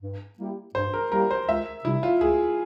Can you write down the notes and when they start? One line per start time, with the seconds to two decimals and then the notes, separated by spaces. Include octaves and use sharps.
0.02 G2
0.39 G3 A#3 E4 G4
0.75 G2 C5
0.93 A#4
1.12 G3 A#3 E4 G4 A#4
1.31 C5
1.48 C#2 E5
1.85 C3 G3 E4
2.03 F4
2.21 C#2 G#4